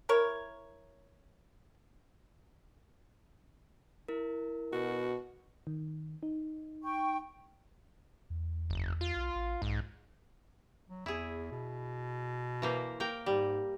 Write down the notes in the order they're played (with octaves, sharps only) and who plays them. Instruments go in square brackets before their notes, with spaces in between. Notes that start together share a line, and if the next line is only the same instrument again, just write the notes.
[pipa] E4 A#4 C#5
[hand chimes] E4 A#4
[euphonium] B2 [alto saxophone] F#4
[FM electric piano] D#3
D#4
[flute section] G5 C#6
[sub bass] E2
[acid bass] F#1
F4
[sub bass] B1
A1
[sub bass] B1 [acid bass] G#2
[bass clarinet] F#3
[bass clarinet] E2 [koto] E4 G#4
[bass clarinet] B2
[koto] E3 A#3 C5
A#3 A#4 G5
[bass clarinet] G#2 [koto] G3